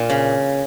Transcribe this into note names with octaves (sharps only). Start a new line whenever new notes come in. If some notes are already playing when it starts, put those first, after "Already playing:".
Already playing: A#2
C#3